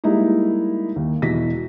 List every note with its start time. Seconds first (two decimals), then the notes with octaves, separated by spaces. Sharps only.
0.04 G3 G#3 A#3 D#4 E4
0.96 D#2
1.22 E1 B2 E4 F#4 A#6 B6